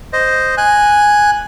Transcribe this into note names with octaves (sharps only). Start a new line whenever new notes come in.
C5 D#5
G#5 F#6